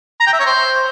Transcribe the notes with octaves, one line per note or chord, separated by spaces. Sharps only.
A#5
G5
E5
C#5
C5